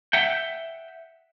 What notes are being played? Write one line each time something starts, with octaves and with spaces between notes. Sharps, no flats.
E5 F#5 G5